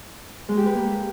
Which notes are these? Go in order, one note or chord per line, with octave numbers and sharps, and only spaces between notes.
G#3
G4
B4
A#3